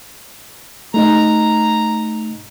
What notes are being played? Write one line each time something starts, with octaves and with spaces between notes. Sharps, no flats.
A3 D#4 D#5 A#5